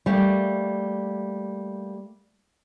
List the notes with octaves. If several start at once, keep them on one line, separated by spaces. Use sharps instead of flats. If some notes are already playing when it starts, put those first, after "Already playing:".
G3 A3 A#3